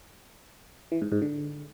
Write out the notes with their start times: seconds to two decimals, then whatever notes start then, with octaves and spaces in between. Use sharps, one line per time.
0.92 E3
1.02 G#2
1.12 G#2
1.22 D3